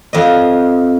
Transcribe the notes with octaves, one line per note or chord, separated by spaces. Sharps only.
F2 D#5